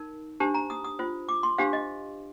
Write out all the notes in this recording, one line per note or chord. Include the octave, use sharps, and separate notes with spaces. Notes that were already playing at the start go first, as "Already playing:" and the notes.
Already playing: D#4 A#4
D4 G4 C5 A5
A#5
D#6
D#6
F4 C5
D6
C6
D4 G4 C5 F5
D#5